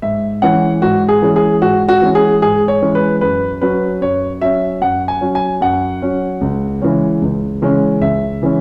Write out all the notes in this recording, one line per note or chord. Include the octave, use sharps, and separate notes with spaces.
G#2 E5
E3 G#3 C#4 F#5
G#2 F#4
G#4
E3 G#3 C#4
G#4
G#2 F#4
F#4
E3 G#3 C#4
G#4
G#2 G#4
C#5
E3 G#3 C#4
B4
F#2 B4
F#3 C#4 B4
F#2 C#5
F#3 C#4 E5
F#2 F#5
G#5
F#3 C#4
G#5
F#2 F#5
F#3 C#4
C#2
C#3 E3 G#3 C#4
C#2
C#3 E3 G#3 C#4
C#2 E5
C#3 E3 G#3 C#4